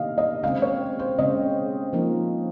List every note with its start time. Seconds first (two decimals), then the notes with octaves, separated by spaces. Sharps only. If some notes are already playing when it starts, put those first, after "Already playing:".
Already playing: C3 D#3 A#3 D#4 G4 D#5 F5
0.18 D#5
0.43 C#3 G#3 C4 F5
0.62 C#5
0.99 C5
1.18 C#3 G#3 C4 D#5
1.93 F3 A#3 D#4